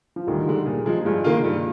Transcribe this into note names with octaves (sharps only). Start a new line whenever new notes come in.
F3
D2 D#3 G3
D3 G#3
A#2
F3 G#3
G2 F3 G#3
D#3 A#3 F4
G2